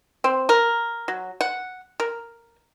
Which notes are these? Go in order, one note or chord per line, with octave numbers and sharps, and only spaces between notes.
C4
A#4
F#3
F#5
A#4